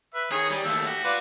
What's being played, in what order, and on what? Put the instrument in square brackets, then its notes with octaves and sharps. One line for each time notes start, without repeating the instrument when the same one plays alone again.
[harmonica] B4 E5
[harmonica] D#3 C#5 G#5 [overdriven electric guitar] G#4
[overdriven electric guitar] G3
[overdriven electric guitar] D#2 A3 [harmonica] E6
[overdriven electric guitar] F#4 [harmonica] G4
[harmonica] F4 B4 D5